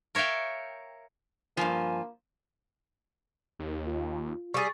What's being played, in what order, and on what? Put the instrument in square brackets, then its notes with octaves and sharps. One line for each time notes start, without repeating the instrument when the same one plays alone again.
[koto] A#4 C#5 E5 F5 G5
[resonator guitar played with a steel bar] G2 F3 [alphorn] A#3 [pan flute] G#5
[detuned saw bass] D#2
[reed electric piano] F4
[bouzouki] G3 G#4 [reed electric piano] C#6 A6